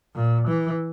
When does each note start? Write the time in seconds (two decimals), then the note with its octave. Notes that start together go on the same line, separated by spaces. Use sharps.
0.15 A#2
0.47 E3